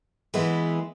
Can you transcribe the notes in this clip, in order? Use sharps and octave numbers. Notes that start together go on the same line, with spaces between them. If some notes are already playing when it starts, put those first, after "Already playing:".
E3 G#3 B3 E4 B4